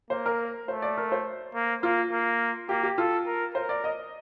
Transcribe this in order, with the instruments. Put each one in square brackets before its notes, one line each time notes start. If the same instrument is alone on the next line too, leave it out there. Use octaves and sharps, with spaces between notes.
[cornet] A#3 [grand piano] C5
[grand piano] A#4
[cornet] A3 [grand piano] C5
[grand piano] D5
A#4
C5
[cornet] A#3
[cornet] A#3 [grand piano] F4
[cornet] A#3
[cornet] A#3 [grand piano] G4
[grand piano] G4
[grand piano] F4 [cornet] A4
[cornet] A#4
[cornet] A#4 [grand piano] C5
[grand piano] D5
D#5